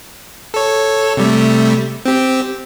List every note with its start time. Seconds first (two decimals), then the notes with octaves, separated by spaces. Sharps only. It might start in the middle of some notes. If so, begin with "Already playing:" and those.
0.54 A4 C#5
1.17 C3 G3 A3
2.05 C4 G4